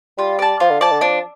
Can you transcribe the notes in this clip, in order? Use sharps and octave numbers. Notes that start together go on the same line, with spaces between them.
G3 F4
D5 A5
F3 F4
D3
F3 D5 A5
D3
F3 D4